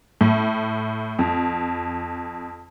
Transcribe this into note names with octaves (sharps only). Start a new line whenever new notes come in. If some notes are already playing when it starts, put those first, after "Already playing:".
A2
F2